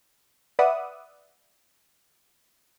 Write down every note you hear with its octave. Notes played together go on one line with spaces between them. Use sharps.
B4 D5 E5 F#5 D#6